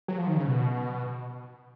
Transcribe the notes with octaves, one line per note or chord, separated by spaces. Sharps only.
F#3
F3
D#3
C#3
B2